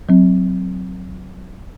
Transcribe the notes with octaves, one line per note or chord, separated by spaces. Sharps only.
F#3 C4